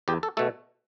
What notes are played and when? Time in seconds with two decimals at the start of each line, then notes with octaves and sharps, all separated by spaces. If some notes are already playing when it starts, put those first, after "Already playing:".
0.08 E2 G4
0.23 A4
0.37 B2 A3 A4